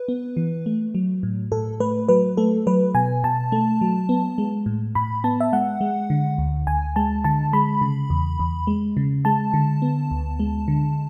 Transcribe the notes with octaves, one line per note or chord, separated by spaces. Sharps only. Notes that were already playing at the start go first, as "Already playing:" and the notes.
Already playing: B4
B3
E3
A3
F#3
A2
A2 A4
A3 B4
F#3 B4
A3 A4
F#3 B4
B2 G#5
B2 A5
A3
F#3
B3
G#3
A2
A2 B5
B3 A5
E5
G#3 F#5
G#3
D3
D2
D2 G#5
G#3 A5
D3 A5
G#3 B5
C#3
E2
E2
G#3
C#3
G#3 A5
D3
B3
D2
G#3
D3